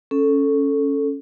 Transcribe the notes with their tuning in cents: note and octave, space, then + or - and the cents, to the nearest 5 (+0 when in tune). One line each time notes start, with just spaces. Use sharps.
C#4 +0 A4 +0